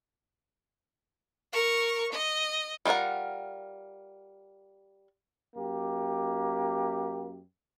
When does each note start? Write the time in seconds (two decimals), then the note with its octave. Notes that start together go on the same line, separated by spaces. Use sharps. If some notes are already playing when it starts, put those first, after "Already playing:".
1.53 A#4 C#6
2.12 D#5
2.85 G3 D#4 F4 A#4 F#5
5.56 F#2 A#3 G4